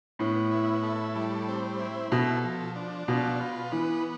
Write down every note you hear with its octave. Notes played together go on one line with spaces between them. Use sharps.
A2 B3
E4
A4
G3
C4
E4
B2 A4
F3
D4
B2 F4
B4
E3 B3